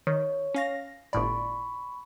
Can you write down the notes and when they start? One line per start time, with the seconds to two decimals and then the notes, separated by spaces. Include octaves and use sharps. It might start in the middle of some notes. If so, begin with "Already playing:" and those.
0.07 D#3 C#5
0.55 C#4 F5 A#6
1.13 G1 A2 D5 B5 C#6